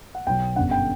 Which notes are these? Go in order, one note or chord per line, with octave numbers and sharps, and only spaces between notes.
F#5
B1 B2 F#3 G5
G1 F#2 D3 F#5
G5